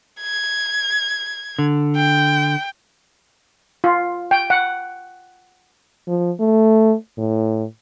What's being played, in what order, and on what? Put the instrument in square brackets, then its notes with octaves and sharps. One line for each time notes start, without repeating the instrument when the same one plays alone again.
[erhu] G#6
[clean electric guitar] D3
[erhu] G5
[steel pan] F4
G5
F#5
[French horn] F3
A3
A2